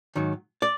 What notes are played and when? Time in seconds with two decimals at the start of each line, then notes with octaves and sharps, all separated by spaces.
0.16 G#2 D#3 F#3
0.62 D5